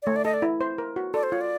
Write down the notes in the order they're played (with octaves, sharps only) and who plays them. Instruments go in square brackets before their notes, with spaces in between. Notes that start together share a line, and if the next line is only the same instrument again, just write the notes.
[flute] D5
[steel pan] A3 [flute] C#5
[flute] D5
[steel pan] A4 [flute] D#5
[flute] D5
[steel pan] E4
C5
A#4
F#4
[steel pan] A4 [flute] D5
[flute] C5
[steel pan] F4 [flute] C#5
[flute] D5